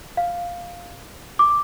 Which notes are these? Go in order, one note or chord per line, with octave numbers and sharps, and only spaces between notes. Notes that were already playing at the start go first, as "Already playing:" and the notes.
F5
D6